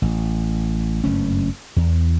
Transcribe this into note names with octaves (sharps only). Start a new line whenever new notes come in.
A1
F#1 G2 A3 C#4
E2